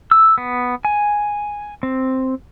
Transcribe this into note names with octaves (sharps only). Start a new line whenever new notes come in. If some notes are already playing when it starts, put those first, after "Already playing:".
E6
B3
G#5
C4